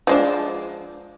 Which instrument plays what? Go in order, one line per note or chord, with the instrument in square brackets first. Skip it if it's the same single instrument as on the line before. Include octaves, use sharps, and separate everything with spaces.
[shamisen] F3 G#3 D4